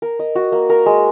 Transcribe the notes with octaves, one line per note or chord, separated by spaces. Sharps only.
A#4
D#5
F#4
A#3
A#4
G#3